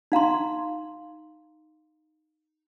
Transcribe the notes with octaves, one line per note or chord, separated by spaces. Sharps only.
D#4 F5 A#5 C6